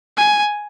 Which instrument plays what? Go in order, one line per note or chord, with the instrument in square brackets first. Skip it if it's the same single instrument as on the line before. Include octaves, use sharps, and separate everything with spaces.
[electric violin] G#5